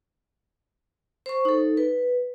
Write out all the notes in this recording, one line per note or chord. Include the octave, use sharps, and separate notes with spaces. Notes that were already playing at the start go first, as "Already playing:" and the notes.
C5 C#6
D#4 A4
B4